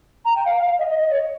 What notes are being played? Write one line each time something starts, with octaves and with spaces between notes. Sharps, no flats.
A#5
G5
F5
F5
F5
D#5
D#5
D#5
C#5